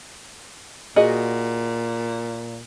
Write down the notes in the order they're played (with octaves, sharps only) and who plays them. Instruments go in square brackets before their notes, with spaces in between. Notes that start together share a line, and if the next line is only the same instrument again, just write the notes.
[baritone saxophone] A#2 [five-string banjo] F#4 G#4 D#5